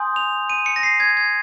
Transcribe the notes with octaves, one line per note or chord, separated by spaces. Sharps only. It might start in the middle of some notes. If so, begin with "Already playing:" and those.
Already playing: G#5 C6 D#6 G6
F7
D#7
C#7
A#6
C7
G#6
G#6